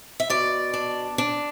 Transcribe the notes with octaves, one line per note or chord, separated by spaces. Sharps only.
E5
B2 D5
D4
D4